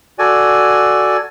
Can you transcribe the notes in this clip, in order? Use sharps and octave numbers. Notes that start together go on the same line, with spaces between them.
F#4 A4 D5 G#5